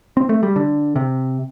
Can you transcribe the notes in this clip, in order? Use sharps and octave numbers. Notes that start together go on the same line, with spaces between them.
C4
A3
G3
D3
C3